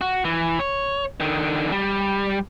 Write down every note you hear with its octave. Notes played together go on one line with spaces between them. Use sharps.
F#4
E3
C#5
D3 D#3
G3